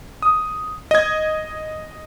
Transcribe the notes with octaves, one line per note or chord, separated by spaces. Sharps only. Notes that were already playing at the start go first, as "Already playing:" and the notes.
D#6
D#5 G#6